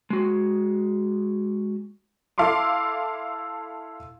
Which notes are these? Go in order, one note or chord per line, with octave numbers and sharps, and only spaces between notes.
G#3 F#4
E4 A4 F5 A5 C6 D6